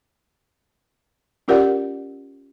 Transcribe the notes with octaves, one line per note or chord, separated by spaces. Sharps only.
C#4 F4 G4 A#4 D5 F#5